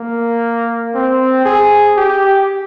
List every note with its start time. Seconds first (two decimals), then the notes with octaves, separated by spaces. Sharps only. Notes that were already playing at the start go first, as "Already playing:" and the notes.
Already playing: A#3
0.94 C4
1.45 G#4
1.97 G4